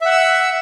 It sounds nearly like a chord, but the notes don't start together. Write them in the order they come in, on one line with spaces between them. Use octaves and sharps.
E5 F#5 E6